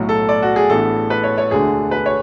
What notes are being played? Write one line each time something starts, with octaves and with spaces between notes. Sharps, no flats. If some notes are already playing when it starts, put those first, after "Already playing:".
Already playing: B1 A2 F#3
A4
D5
F#4
G#4
A1 A2 E3 B3 D4 A4
B4
C#5
C#5
E1 D2 D3 A3 D4 G#4
B4
C#5